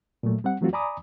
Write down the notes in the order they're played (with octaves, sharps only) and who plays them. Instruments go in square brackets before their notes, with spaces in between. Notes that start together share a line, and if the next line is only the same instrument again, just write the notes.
[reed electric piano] A#2 F#3 A3
G3 C4 F#5
E3 F#3 A3 C4 F4 F#4
D5 G#5 A#5 B5 D6 D#6